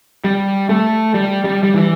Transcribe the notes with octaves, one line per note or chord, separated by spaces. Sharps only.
G3
A3
G3
G3
G3
E3